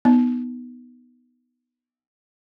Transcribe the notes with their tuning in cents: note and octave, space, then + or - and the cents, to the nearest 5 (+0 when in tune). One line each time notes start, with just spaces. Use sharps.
B3 +0 D#4 +0